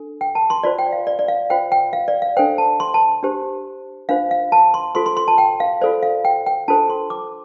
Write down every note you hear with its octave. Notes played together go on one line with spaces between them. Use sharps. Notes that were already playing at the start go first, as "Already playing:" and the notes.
Already playing: D4 A4
G5
A5
C6
F4 C5 D5
G5
F5
D5
D5
F5
F4 C5 G5
G5
F5
D5
F5
D4 A4 C5 G5
A5
C6
A5
D4 G4 C5
D4 F4 C5 F5
F5
A5
C6
F4 A4 C5 C6
C6
C6
A5
G5
F5
F4 A4 C5 D5
F5
G5
G5
D4 F4 A4 C5 A5
C6
D6